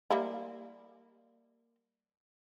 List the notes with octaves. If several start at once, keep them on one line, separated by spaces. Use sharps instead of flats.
G3 A#3 E4